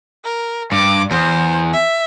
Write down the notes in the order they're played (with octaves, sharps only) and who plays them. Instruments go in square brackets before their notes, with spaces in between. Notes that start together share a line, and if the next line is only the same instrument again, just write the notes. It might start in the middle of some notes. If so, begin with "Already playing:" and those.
[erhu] A#4
[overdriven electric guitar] G2 [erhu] D6
[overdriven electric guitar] E2 [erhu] C5
[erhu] E5